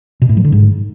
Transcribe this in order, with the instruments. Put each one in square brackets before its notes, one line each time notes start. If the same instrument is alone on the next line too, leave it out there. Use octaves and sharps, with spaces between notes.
[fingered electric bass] B2
A2
F#3
D3
G#2